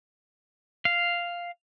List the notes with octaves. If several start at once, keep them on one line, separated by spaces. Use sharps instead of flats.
F5